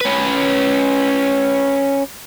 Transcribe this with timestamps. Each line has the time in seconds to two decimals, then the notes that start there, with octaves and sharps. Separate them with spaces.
0.01 C#4 B4